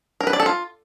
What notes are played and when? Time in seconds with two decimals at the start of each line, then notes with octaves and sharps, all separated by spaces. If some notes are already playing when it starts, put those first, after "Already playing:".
0.21 A#4
0.27 B4
0.33 D5
0.40 A4
0.46 F4